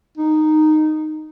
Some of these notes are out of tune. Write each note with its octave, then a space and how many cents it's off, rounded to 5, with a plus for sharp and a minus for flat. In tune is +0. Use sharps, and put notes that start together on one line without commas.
D#4 -10